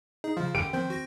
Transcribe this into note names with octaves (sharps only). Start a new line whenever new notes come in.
D#4 G#4
C#3 F3 F4
F#2 D3 G4 D7
D#3 F3 C4 G6
F#4 A#6